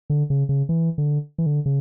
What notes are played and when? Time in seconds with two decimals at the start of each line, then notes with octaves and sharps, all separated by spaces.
0.10 D3
0.30 C#3
0.49 C#3
0.69 E3
0.98 D3
1.38 E3
1.46 D3
1.66 C#3